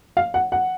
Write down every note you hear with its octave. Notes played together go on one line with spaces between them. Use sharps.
F5
F#5
F#5